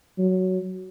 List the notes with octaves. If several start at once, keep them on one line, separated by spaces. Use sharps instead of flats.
F#3